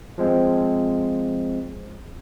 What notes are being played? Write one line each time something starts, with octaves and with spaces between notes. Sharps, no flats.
F3 G#3 C4